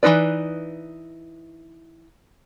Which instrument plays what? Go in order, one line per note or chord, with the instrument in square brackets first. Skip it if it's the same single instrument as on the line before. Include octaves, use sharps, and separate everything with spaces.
[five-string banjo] E3 A3 D#4 B4 D5